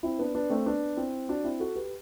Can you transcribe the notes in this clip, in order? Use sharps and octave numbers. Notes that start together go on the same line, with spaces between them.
C4 E4
B3 D4
B3 D4
A3 C4
B3 D4
C4 E4
D4 F#4
C4 E4
F#4 A4
G4 B4